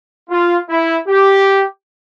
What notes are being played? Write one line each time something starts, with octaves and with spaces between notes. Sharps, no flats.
F4
E4
G4